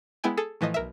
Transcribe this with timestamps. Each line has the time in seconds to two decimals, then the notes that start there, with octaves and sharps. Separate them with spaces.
0.24 G#3 B3 E4 G5 G#5
0.37 G#4 A4
0.61 A2 E3 F3 D#5
0.74 B1 A#4 E5